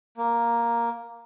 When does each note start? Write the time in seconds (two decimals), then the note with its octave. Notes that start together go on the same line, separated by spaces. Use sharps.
0.18 A#3